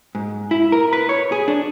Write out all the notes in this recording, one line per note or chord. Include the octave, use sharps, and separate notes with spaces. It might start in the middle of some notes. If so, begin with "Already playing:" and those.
G#2
E4
A#4
B4
C#5
G#4
D4